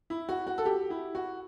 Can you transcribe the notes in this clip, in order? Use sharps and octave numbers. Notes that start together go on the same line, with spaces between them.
E4
F#4
F#4
A4
G4
E4
F#4